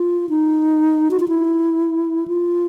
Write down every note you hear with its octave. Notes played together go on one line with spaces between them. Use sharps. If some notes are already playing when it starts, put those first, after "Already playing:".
Already playing: F4
D#4
F#4
F4
E4
F4